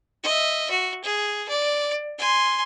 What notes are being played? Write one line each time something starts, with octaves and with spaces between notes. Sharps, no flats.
D#5 E5
F#4
G#4
D5
G#5 C6